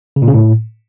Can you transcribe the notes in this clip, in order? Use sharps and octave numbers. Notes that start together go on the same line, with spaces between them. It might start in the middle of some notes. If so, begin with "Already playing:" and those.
C#3
A#2
C#3
A2